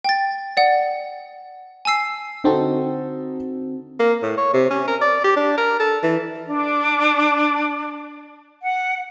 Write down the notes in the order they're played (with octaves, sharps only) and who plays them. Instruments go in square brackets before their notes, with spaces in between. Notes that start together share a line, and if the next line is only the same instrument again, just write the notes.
[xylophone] G5 A6
D5 F#5
G#5 A5 E6 C7
[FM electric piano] D3 C4 F#4 [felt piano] D#4 A4
[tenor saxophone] A#3
A2
C#5
C3
C#4
A#4
D5
G4
D4
A#4
A4
E3
[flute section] D4
F#5